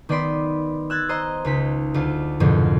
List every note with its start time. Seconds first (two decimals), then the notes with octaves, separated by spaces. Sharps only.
0.09 D#3 B3 D5 B5 C6 D7
0.90 E6 F#6 G#6 A6
1.09 C5 D#5 A#5 C6
1.45 C#2 D#4 B6
1.94 D2 F4
2.40 C2 F2 G#2 B2 D3